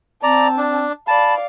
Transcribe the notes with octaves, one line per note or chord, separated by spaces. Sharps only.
C4 D5 A5 A#5
D4
D5 F5 A5 B5